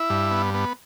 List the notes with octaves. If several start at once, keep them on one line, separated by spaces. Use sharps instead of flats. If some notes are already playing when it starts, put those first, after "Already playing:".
Already playing: E4
G2
B3
B3